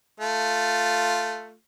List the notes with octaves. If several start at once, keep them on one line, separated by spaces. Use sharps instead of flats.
A3 F4